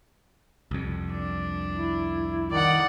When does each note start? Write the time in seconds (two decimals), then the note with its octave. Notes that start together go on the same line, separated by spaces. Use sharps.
0.71 C2 F2
1.12 D4
1.71 E4
2.51 D#3 D5 F#5